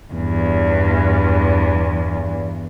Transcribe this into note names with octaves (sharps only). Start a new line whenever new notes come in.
E2 G2